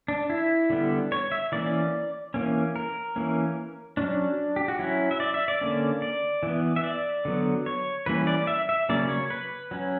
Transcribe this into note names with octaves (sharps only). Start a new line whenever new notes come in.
D4
E4
D3 G3 B3
C#5
E5
E3 A#3 C#4 D5
E3 A#3 C#4
A#4
E3 A#3 C#4
F#3 C#4 D4
G4
F#4
F#3 C#4 E4
E5
D5
E5
D5
D3 A#3 C#4
D5
E3 B3
E5
D5
D3 F#3 B3
C#5
E3 G3 A#3 C#4 B4
D5
E5
E5
C#3 F#3 A#3 C#4 D5
C#5
B4
F#3 C#4